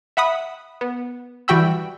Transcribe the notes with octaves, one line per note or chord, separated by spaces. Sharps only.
E5 F#5 B5 D#6
B3
E3 G3 F#4 G5 B5 E6